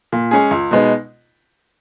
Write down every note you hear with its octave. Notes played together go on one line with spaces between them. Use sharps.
A#2
G#3 C#4 G#4
C#2
B2 G#3 B3 D#4